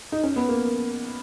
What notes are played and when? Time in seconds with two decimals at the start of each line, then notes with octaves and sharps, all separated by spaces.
0.12 D#4
0.24 C#4
0.36 B3
0.49 A#3